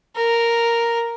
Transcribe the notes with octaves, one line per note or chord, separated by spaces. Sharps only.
A#4